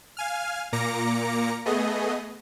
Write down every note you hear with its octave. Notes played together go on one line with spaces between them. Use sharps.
F5 G#5 F6
A#2 A#3 A#5 D6 A#6 C#7
A3 B3 G#4 D#5